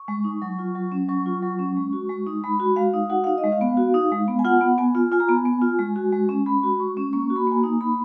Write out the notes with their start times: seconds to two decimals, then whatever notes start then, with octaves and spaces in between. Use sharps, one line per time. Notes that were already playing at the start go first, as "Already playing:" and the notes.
Already playing: C#6
0.08 G#3
0.24 D#4
0.42 F#3
0.59 F4
0.75 F#3
0.92 C#4
1.08 F#3 C#6
1.26 F4
1.42 F#3
1.59 C#4
1.76 G#3
1.93 F#4
2.09 G#3
2.27 D#4
2.44 G#3 B5
2.60 F#4
2.76 G#3 F5
2.94 D#4
3.10 F#4 F#5
3.24 D#4 F5
3.38 D#5
3.44 G#3
3.52 F5
3.61 B3
3.77 F#4
3.94 D#4
4.12 G#3
4.28 B3
4.39 G#5
4.45 F4 F#5
4.61 B3
4.78 B3 G#5
4.95 F4
5.12 F4 G#5
5.20 A#5
5.28 B3 G#5
5.45 B3
5.62 F4
5.79 G#3
5.96 F#4
6.13 G#3
6.29 C#4
6.46 G#3 B5
6.63 F#4
6.80 G#3 C#6
6.97 C#4
7.13 A#3 C#6
7.30 F#4
7.36 B5
7.47 A#3 G#5
7.58 A#5
7.64 D#4
7.81 A#3 B5